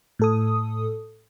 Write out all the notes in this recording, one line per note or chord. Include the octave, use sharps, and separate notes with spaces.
A2 A4 D#6